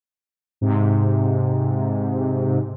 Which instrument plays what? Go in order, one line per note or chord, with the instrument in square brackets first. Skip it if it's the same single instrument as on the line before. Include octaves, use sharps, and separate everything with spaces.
[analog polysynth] G#2 C3